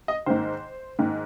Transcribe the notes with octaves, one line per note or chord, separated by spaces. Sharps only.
D#5
G#2 D#3 C5
G#2 D#3